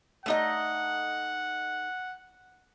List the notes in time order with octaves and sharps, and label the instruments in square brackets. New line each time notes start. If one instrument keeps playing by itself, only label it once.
[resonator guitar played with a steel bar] A3 D#4 D#5 [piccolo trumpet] F#5